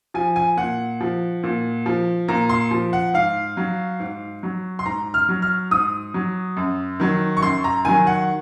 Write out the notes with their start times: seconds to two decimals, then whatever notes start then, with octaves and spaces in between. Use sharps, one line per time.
0.14 F3 G#5
0.36 G#5
0.57 A#2 F#5
1.00 F3
1.43 A#2
1.86 F3
2.28 A#2 A#5
2.49 C6
2.71 F3
2.93 F#5
3.14 G#2 F5
3.57 F#3
4.00 G#2
4.43 F#3
4.79 C6
4.86 G#2 A#5
5.14 F6
5.29 F#3
5.42 F6
5.71 G#2 D#6
6.14 F#3
6.57 F#2
7.00 D#3 F#3
7.37 C#6
7.42 F#2 C6
7.64 A#5
7.85 D#3 F#3 G#5
8.07 F#5